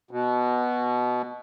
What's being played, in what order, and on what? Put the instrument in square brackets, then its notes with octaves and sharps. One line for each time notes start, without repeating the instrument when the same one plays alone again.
[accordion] B2